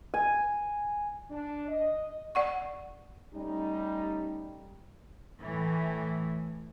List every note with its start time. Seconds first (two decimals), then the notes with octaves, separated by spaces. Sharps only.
0.14 G#5
1.30 D4
1.68 D#5
2.35 D5 F#5 C#6
3.35 G3 A3 C#4 D#4
5.41 A2 E3